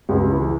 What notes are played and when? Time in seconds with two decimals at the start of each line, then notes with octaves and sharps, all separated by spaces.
0.09 C#2
0.30 E3